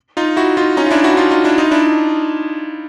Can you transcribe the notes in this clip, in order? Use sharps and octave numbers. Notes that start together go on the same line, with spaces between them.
D#4 F4
E4 F#4
D#4 F4
C#4 D#4
F4
D4 E4
E4 F#4
D#4 F4
D#4 F4
D4 E4
D#4 F4
D4 E4